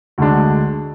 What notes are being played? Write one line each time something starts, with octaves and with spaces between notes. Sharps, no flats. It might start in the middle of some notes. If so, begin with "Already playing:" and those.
D2 D3 G#3 D4